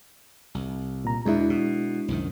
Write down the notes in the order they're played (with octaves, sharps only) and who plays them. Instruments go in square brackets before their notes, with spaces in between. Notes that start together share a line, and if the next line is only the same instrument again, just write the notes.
[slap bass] C2
[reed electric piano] A#2 A#5
[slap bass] E2 B2 [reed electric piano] G#3 D4 E4
[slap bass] B2
C2 F#2 D#3